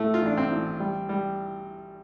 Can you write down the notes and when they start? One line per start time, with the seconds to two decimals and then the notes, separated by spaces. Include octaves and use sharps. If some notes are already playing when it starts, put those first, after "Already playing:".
Already playing: A2 A3
0.14 F4
0.22 A1 D4
0.37 C4
0.51 A1
0.80 G3
1.09 G3